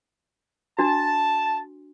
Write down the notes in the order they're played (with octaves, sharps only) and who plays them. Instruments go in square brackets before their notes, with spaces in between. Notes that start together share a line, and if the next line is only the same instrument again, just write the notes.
[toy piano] D4 F#4 [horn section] A5